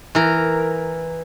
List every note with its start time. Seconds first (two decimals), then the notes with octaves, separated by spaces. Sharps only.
0.15 E3 A#4